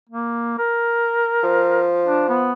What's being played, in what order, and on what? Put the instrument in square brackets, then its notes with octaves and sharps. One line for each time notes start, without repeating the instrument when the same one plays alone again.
[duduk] A#3
A#4
[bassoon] F3
[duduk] D4
B3